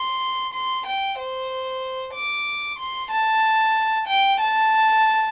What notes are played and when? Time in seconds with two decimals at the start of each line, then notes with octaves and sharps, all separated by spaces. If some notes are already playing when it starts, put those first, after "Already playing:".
Already playing: C6
0.53 C6
0.86 G5
1.18 C5
2.14 D6
2.78 C6
3.10 A5
4.07 G5
4.40 A5